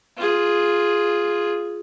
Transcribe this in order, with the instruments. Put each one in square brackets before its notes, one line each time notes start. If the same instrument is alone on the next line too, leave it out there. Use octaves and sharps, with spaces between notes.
[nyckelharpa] F4 G#4